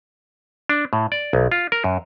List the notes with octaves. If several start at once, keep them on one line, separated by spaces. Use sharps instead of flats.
D4
A2
D5
B1
F4
A#4
F#2